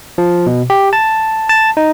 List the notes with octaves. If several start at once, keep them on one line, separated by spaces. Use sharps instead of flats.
F3
B2
G4
A5
A5
D#4